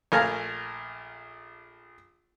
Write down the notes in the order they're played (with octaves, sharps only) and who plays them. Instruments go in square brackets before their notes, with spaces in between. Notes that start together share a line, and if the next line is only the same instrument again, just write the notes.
[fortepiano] A#1 A3 A#4 F5 G#5 A5